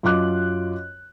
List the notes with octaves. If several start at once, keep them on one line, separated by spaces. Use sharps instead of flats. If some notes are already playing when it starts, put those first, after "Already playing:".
F#2 F4 D#5 D6 F#6